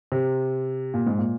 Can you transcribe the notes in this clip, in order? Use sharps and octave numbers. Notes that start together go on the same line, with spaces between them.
C3
A#2
G#2
A#2